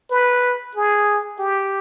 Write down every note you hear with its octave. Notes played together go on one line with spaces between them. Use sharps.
B4
G#4
G4